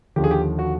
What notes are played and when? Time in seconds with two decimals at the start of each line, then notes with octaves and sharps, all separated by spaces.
0.16 D#2 D3 F3 G4
0.24 G#4
0.31 G4
0.59 F#4